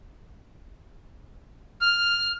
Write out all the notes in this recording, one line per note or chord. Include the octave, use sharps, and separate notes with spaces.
F6